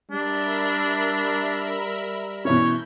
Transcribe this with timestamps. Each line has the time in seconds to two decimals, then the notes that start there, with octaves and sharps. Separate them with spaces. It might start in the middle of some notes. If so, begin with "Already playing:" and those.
0.11 G3 D4 A#4 E5 B5
2.45 B2 E3 C#4 C#5 G6